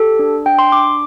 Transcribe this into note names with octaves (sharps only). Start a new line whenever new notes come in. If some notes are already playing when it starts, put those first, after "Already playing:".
Already playing: G4 A4
D4
D4 G5
C6
D4 D6